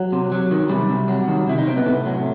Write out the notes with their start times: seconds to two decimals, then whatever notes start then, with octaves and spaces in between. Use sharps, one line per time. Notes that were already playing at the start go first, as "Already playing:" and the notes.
Already playing: F#3
0.12 C3
0.32 F#3
0.51 D#3
0.69 C3 G3
0.89 C3
1.08 F#3
1.28 D#3
1.47 C3 E4
1.58 D#4
1.67 C3 C4
1.77 B3
1.85 A2 C3 A3
2.05 F#3